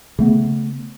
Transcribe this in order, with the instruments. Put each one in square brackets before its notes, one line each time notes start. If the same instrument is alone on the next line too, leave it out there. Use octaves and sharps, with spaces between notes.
[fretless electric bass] C#3 A3 B3